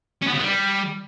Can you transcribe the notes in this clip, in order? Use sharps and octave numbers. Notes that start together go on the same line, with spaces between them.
C#4
B3
C#3
B3
G3